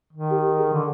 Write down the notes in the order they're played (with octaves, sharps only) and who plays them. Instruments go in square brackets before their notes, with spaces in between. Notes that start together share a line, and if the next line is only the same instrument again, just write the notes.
[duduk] D#3
[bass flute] G4
G#4
[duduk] D3